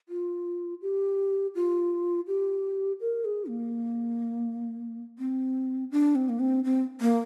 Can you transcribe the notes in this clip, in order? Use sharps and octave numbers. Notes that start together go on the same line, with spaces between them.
F4
G4
F4
G4
A#4
G#4
A#3
C4
D4
C4
A#3
C4
C4
A#3